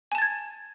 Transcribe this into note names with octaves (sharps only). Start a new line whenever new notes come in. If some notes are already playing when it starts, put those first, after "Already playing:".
G#5 A5 G#6 A6